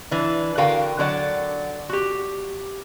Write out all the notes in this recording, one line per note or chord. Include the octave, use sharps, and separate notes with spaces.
E3 D4
D3 F#4 A#4 F5 G5
D3 F#3 D5 F#5
F#4 G4